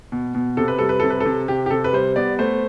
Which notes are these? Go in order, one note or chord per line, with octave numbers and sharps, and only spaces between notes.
B2
B2
C3 A4
B4
G3 A4
B4
C3 A4
B4
A4
C3
C3 G4
G4
C3 A4
B4
G3 C5
B3 D5
A3 C5